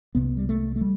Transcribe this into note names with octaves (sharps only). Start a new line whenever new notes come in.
C2 C3 B3
G3
A3
A3
G3